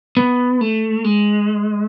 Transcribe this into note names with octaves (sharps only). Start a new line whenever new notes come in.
B3
A3
G#3